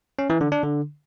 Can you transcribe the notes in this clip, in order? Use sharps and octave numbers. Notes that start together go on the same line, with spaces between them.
C#4
E3
D3
D4
D3